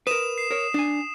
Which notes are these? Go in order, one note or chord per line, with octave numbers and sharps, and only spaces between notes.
A#4 B4 D#6 E7
C7
A#4 C#5
D4 G#5